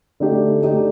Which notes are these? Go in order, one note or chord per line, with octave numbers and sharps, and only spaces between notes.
D3 A3 D#4 G4
D3 A3 D#4 G4